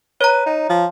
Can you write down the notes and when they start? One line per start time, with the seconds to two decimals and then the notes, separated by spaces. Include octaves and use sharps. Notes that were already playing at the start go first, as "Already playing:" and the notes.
0.21 B4 C#5 A#5
0.46 D#4
0.69 F3